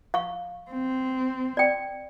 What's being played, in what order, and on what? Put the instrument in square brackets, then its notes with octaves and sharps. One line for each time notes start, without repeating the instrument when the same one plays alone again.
[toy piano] F5 C#6
[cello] C4
[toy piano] D5 G5